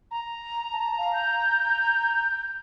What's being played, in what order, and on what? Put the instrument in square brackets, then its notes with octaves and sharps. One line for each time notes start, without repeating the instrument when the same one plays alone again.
[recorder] A#5
[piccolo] A5
F5
G6